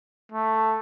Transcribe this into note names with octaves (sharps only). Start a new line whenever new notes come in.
A3